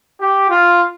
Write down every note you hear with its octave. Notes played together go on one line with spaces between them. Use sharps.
G4
F4